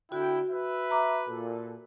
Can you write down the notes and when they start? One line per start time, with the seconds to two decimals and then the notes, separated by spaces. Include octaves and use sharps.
0.12 D3 E4 F#4 G5
0.50 B4 E5
0.91 A#5 D6
1.28 A#2 A4